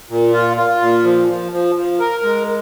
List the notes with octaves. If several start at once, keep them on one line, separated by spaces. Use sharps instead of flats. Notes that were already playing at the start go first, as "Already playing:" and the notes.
A#2
F4
F4
A#2
F3
F3
F3
F3
A#4
G#3